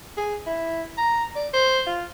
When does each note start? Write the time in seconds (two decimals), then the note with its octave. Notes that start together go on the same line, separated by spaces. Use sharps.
0.17 G#4
0.46 E4
0.98 A#5
1.36 D5
1.53 C5
1.87 F4